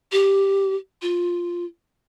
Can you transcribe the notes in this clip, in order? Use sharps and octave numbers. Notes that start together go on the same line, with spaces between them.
G4
F4